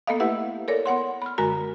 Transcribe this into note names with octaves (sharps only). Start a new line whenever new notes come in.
A#3 B3 A4 D#5 F5
A3 E4 G4 B4 E5 F#5
A4 A#4 C#5 D5
B3 C#5 F#5 C6
B5 F6
F#2 D3 G#3 F#4 A#4 A#5